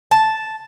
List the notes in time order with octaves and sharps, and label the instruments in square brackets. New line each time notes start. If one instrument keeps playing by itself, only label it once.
[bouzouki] A5